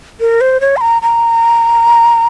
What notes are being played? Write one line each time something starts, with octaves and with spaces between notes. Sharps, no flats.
A#4
C5
C#5
C6
A#5
A#5